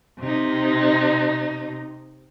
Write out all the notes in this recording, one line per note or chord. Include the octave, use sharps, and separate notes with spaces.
C3 D#4